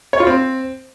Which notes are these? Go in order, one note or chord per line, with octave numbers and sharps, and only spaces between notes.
C#5
F4
C4